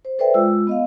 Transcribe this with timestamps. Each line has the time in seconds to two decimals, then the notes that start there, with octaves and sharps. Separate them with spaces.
0.05 C5
0.19 A4 B4 C5 D5 E5 G5
0.34 G#3 F4 E6
0.67 B3 D#5 F5